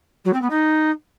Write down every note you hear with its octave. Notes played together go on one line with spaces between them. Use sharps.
F#3
C4
B3
D#4